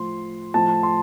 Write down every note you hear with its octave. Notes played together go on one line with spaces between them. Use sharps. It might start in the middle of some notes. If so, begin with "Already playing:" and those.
Already playing: A2 F3 C6
A2 F3 A5
C6